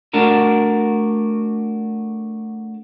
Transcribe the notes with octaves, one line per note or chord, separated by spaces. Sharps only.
A3 D4 F#4 A#4